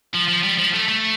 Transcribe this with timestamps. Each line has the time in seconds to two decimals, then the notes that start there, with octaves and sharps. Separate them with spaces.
0.14 F3
0.29 F3
0.44 G3
0.59 F3
0.74 A3
0.88 A3